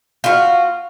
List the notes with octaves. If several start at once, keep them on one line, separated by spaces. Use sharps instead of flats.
F4 F#4